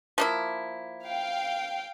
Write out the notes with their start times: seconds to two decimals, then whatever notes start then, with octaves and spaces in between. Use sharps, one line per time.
0.18 F3 A#3 E4
1.06 F5 G5